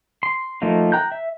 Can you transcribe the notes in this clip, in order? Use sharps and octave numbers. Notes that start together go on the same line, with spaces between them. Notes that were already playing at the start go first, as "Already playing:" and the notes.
C6
F3 A3 A#3 D#4
G5 A#5 F#6 G6
E5